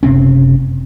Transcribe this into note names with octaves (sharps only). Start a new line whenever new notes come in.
F#1 C3 C4 C#4